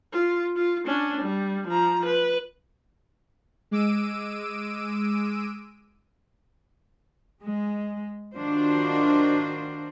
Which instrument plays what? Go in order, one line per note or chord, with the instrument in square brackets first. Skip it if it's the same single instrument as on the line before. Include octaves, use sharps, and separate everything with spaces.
[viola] F4
F4
C#4 D4
G3
F3 A#5
B4
[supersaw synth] G#3 D6 E6 D7 D#7
[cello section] G#3
D#3 D4 F4 F#4 C5